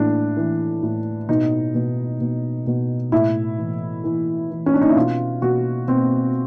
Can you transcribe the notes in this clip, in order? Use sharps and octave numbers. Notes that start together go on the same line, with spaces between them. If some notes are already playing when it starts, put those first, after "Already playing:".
Already playing: A2 E3 D4
E3
A2
B2 D#4
B2
B2
B2
A2 E4
E3
E3
E3
C#4
D4
D#4
E4
B2 F4
B2 F#4
B2 C4